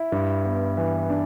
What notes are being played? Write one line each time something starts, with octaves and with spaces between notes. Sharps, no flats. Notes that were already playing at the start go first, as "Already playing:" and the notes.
Already playing: E4
G2
B3
E3
D4